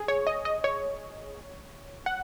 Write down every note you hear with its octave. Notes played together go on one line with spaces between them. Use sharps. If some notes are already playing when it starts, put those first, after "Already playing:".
Already playing: G#4
C#5
D#5
D#5
C#5
F#5